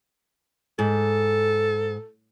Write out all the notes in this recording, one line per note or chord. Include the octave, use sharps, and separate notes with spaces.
G#2 A4